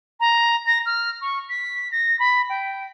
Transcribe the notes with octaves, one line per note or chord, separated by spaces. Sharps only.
A#5
A#6
F6
C#6
B6
A#6
B5
G5